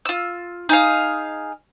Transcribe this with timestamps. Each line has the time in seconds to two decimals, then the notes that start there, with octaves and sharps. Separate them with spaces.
0.05 F4 E6
0.69 D#4 G#4 F5